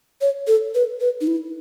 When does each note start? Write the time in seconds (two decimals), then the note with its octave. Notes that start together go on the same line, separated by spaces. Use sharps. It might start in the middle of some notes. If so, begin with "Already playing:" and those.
0.21 C#5
0.47 A4
0.75 B4
1.01 B4
1.21 D#4
1.27 E4